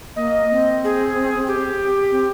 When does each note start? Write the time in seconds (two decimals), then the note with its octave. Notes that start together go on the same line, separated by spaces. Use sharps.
0.16 A#3 D#5
0.51 C4
0.84 G#4
1.47 G4
2.11 C4